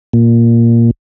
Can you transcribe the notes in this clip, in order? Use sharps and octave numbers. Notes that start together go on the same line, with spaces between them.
A#2